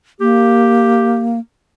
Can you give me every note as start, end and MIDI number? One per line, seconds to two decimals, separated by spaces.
0.21 1.39 58
0.21 1.36 67